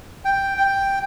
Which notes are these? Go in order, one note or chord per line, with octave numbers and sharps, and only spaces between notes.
G5
G5